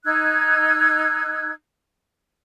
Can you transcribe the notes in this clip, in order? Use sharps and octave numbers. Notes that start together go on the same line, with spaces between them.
D#4 E6 F#6 G#6